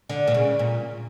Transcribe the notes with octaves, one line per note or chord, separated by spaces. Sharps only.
D3
A#2
C#3
A#2